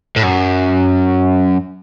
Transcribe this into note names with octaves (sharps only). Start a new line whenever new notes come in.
A2
F#2